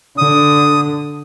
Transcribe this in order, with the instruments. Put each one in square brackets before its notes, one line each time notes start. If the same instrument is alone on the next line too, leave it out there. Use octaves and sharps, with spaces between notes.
[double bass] D3 [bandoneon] D#6